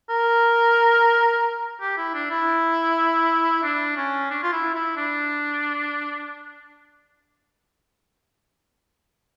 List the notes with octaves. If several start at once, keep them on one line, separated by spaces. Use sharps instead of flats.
A#4
G4
E4
D4
E4
D4
C#4
D4
F4
E4
E4
D4